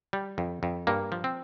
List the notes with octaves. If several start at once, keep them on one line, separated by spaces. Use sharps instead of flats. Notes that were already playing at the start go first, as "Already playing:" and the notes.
G3
F2
F2
G2 A#3
F3
C4